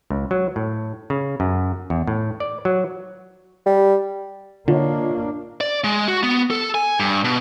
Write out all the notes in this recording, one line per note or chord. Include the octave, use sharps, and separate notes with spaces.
C#2
F#3
A2
C#3
F#2
E2
A2
D5
F#3
G3
D3 A#3 D4 F4 C#5 D#5
D5
G#3
F#4
B3
A4
G#5
G2
B2